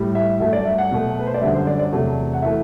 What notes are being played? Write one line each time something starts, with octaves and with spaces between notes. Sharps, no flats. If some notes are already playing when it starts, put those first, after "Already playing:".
Already playing: A2 G3
E5
G2 F#3 A3 E5
D5
E5
F#5
B2 F#3 A3
B4
C5
D5
F#2 D3 G3 E5
C5
D5
D5
E2 C3 F#3 A3
F#5
E3 A3 E5